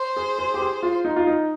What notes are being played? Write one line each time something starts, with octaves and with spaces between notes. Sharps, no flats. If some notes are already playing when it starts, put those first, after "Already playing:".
Already playing: C5
G#4
G#4
G4
G#4
F4
D#4
F4
D#4